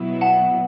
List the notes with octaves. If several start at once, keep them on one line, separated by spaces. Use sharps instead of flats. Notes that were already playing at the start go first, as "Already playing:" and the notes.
Already playing: B2 F#3 B3 E4
F#5 A5